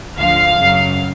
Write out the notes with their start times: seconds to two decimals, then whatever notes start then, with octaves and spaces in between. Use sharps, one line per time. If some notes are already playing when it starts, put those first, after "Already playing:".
0.18 D2 D3 F3 F5
0.57 F#2 C#3 F#3